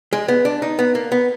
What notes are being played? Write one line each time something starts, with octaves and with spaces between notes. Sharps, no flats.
G#3
B3
D4
D#4
B3
A#3
B3